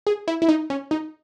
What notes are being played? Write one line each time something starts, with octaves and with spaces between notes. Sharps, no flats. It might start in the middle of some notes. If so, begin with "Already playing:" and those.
G#4
E4
E4
D#4
C#4
D#4